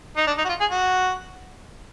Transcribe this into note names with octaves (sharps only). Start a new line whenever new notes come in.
D#4
D4
D#4
F#4
F4
G#4
F#4